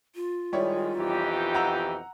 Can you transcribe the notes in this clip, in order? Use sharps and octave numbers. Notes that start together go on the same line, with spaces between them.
F4
D#3 G3 G#3 E4 C#5
F2 B2 D#3 E3 D#4 G4
F#5 A#5 E6